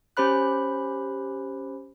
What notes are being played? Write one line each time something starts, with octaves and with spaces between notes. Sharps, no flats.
C#4 G4 C5 B5 F#6